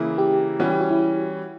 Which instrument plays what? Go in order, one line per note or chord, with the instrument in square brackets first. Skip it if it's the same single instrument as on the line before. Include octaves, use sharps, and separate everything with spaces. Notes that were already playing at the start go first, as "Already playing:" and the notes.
Already playing: [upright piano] C#3 E3 A#3 E4
[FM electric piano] G4
[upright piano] E3 G3 C#4 [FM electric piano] F#4
[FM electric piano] G4
F#4
E4